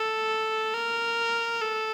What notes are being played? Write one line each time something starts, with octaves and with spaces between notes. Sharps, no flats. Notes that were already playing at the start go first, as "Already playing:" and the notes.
Already playing: A4
A#4
A4